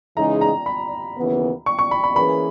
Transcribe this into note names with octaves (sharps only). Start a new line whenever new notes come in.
C#3 E3 G#3 D#4 G#4 A#5
A#5
B5
D#2 C#3 E3 B3
C#6
C#6
B5
B5
E3 A#3 C#4 G#4 B4 B5